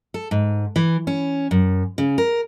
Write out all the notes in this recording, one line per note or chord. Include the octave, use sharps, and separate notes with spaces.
A4
G#2
E3
C#4
F#2
C#3
A#4